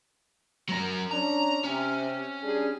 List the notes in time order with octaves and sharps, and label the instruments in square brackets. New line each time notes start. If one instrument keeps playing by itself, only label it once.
[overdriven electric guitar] F#3 A#4
[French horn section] C#4 D4 [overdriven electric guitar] A#5
[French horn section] C3 [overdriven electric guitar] C#4
[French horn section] G3 D4 G#4